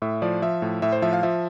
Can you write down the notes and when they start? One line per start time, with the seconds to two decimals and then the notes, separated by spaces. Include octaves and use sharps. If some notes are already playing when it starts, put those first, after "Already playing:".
0.02 A2 E5
0.22 F3 D5
0.42 F3 E5
0.62 A2
0.82 A2 E5
0.92 C5
1.02 F3 E5
1.13 F5
1.23 F3 E5